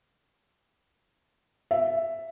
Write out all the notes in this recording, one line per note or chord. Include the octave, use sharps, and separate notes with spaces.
E5